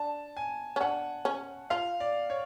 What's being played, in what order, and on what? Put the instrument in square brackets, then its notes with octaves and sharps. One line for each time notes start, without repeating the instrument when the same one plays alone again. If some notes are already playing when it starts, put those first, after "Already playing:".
Already playing: [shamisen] D4 [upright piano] A5
[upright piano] G#5
[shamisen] C#4
[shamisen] D4 [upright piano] F#5
[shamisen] C#4
[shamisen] F4 [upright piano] F5
[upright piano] D5
C#5